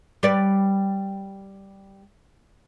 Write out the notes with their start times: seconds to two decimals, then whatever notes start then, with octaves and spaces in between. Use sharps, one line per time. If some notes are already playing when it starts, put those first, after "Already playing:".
0.23 G3 B4 D5